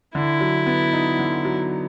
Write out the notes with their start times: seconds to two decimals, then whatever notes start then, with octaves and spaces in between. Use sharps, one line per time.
0.15 D3 E4
0.40 F#3
0.66 B3
0.93 D#4
1.19 D3
1.45 F#3